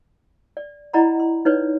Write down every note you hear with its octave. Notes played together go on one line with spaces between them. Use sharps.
D5
E4 D5 D#5 F#5 A#5 B5
C6
D#4 B4 C#5 D5